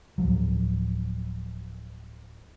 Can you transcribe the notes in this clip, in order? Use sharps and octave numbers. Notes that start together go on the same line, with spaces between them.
D1 C2 F3 F#3